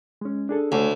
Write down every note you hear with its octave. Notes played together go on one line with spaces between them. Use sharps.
G#3 C#4
D4 G#4 A4
D2 A3 C#5 G#5